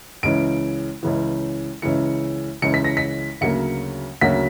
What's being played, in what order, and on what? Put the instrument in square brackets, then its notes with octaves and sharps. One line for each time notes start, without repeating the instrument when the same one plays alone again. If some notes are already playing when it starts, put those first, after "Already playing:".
[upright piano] C#2 C#3 E3 D7
C#2 C#3 E3
C#2 C#3 E3 C#7
C#2 C#3 E3 C#7
B6
A#6
B6
D2 C#3 F#3 A#3 C#7
D2 C#3 F#3 A#3 B6